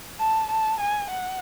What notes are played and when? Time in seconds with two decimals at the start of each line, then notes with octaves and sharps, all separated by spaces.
0.19 A5
0.50 A5
0.81 G#5
1.11 F#5